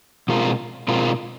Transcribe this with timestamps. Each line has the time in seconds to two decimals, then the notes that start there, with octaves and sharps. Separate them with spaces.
0.28 B2 G#3 C4 F4 A#4
0.88 B2 G#3 C4 F4 A#4